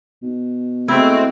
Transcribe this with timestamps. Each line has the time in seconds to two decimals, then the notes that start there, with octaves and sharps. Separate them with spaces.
0.23 B2
0.88 G#3 A3 C4 E4 F#4